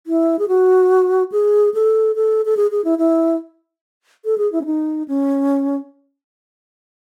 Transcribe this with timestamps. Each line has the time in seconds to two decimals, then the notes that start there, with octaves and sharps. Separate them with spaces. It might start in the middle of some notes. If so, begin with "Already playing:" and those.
0.07 E4
0.39 G#4
0.48 F#4
1.32 G#4
1.74 A4
2.16 A4
2.45 A4
2.57 G#4
2.71 G#4
2.85 E4
2.98 E4
4.25 A4
4.38 G#4
4.52 E4
4.61 C#4
4.65 D#4
5.08 C#4